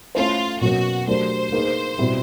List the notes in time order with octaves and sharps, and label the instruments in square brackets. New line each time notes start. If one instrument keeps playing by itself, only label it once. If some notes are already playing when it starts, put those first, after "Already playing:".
[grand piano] A3 C#4 E4 A4 C5 [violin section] F4
[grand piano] B2 F#3 A#3 C#4 [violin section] F#4
[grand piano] F#3 A3 D4 G4 A#4 [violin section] C5
[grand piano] A#3 D#4 G#4 B4
B2 G3 C4 E4